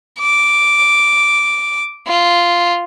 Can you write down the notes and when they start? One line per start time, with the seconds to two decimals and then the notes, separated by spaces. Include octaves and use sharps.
0.19 D6
2.07 F4